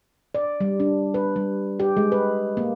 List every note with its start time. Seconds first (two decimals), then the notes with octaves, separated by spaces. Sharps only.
0.35 D5
0.60 G3
0.80 D4
1.14 B4
1.36 G3
1.80 G4
1.97 G#3
2.12 B4
2.57 A#3